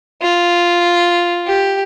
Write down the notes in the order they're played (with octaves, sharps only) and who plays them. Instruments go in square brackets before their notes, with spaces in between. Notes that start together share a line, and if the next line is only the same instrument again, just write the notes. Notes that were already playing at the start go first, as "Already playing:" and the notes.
[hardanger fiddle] F4
G4